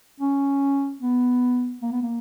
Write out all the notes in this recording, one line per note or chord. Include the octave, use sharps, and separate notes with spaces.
C#4
B3
A#3
B3
A#3